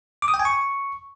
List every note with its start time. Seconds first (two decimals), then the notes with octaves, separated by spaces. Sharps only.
0.22 D6
0.28 D#6
0.34 G5
0.39 G#5
0.45 C#6